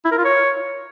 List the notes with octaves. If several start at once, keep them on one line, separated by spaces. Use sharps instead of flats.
E4
A#4
F4
C#5